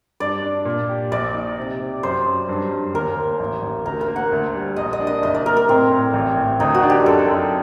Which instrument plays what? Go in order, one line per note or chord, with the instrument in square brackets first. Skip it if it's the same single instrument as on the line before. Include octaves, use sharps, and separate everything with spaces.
[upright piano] G2 [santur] D5
[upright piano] D4
A#2
G4
[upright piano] A#1 [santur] D5
[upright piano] D#4
C3
C3
[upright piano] F#2 [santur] C5
[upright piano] F#2
G2
G2
[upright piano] D#2 [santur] A#4
[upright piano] D#2
A1
A1
[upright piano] D2 [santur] A#4
[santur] A#4
[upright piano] A#3
[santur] F#5
[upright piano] D2
G3
[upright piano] A#1 [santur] D#5
[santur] D#5
[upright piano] D4
[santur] D#5
[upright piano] F#1 [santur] D#5
[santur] D5
[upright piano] F#1 [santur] A#4
[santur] A#4
[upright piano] A2 [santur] C4
[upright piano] A2
A1
A1
[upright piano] D2 [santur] D#4
[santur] F#4
[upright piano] D4
[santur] G4
[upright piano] F#2 [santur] A4
[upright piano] F#2